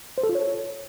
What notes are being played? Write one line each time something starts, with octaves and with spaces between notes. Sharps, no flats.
C5
A4
F4
C#5